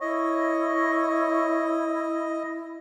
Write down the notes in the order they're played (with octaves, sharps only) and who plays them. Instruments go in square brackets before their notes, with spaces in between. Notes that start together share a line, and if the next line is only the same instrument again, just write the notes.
[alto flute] E4 [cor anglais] C#5 [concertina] D#5